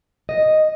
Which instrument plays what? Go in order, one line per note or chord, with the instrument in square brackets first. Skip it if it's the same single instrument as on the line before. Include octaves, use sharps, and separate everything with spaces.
[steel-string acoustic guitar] D#5